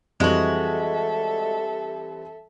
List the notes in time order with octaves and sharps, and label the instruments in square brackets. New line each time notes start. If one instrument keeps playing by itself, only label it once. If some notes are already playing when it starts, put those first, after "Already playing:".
[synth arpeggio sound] F2 [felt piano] E3 G3 C4 [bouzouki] G#3 F#4 [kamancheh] A4 E5